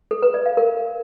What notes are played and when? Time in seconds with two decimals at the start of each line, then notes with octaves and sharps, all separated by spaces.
0.11 A4
0.23 B4
0.34 D5
0.46 F5
0.57 A#4